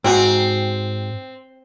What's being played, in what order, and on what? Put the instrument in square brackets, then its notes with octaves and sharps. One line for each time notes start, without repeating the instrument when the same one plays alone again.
[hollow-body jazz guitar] G#2 F#4 G#5 [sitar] C4